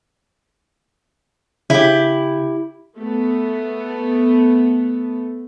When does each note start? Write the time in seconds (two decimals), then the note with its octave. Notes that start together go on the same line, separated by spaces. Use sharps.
1.70 C#3 E4 G4
2.97 A3 B3